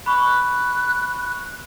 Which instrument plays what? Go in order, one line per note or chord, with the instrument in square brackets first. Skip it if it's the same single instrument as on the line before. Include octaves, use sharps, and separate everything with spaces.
[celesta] B5 C#6 [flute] F#6